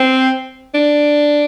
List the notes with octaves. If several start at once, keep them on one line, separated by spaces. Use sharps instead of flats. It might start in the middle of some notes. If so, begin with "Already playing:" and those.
Already playing: C4
D4